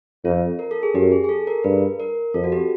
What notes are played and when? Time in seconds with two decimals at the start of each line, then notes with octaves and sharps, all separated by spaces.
0.24 F2 F4
0.59 A#4
0.71 A4
0.83 G#4
0.94 F#2 G4
1.12 G#4
1.24 G#4
1.29 A4
1.47 A#4
1.64 G2 B4
2.00 A#4
2.34 F2 A4
2.44 F#4
2.52 G4